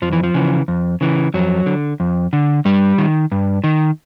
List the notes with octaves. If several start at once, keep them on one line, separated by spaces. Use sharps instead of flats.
F2 F3
E3
F3
C#3 E3
F2
C#3 E3
F2 F#3
D3
F2
D3
G2 G3
D#3
G2
D#3